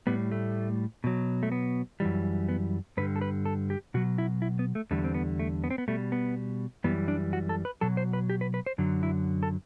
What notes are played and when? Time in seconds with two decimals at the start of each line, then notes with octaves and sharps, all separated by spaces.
0.07 A2 G3 B3
0.32 A3
1.04 B2 F#3
1.43 A3
1.52 B3
2.00 F#2 E3 G3
2.49 B3
2.97 G2 D3 G3 B4
3.16 A4
3.21 B4
3.45 A4
3.70 G4
3.94 B2 F#3 F#4
4.18 E4
4.42 E4
4.59 B3
4.75 A3
4.91 E2 D3 G3 A3
5.04 C4
5.14 B3
5.40 A3
5.64 B3
5.70 C4
5.78 B3
5.88 B2 G3 A3
6.12 B3
6.84 F#2 E3 G3 B3
7.08 D4
7.33 F#4
7.49 A4
7.65 B4
7.81 B2 F#3 A4
7.97 C5
8.13 B4
8.30 G4
8.41 B4
8.54 B4
8.66 C5
8.78 F#2 D3 F#3
9.03 E4
9.43 A4